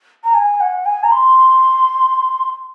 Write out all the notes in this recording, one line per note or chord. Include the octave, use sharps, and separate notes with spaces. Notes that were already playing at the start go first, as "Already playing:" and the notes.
A#5
G#5
F#5
G#5
A#5
C6